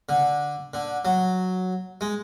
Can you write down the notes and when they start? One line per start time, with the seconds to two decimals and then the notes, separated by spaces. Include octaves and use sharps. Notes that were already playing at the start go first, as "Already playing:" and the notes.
0.09 D3
0.74 D3
1.05 F#3
2.01 G#3